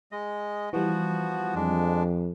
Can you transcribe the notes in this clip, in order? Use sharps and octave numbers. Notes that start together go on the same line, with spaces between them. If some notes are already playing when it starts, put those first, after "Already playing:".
G#3 D#5
E3 F3 G3 B3 F#4
F2 G#3 D4